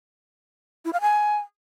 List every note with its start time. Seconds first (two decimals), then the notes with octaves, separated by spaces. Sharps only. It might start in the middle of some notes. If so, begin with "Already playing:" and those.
0.85 E4
0.93 F5
1.01 G#5